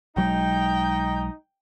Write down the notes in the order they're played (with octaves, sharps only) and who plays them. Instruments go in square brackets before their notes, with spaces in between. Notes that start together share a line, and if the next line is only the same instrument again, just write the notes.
[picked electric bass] B1 F#3 G#3 [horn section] D#4 [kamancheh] G5